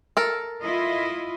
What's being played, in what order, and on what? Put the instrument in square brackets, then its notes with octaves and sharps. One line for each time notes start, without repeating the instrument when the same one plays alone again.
[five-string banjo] A4 A#4
[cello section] E4 F4 D#5